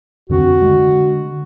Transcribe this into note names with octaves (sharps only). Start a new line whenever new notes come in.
F2 D3 C4 F#4
D3 G#3